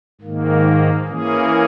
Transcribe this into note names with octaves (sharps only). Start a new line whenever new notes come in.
G#2 D#3 A#3
E3 A#3 C#4 G#4